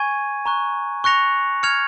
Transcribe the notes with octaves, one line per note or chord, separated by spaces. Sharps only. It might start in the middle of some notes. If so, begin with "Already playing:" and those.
Already playing: G#5 C#6 G#6 D#7
A#5 C#6 F#6
C#6 F#6 A#6 C#7 F7
F6 G#6 C#7 F7